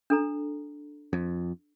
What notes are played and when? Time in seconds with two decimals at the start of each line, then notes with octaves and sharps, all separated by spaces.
0.10 D4 A4 A#5
1.13 F2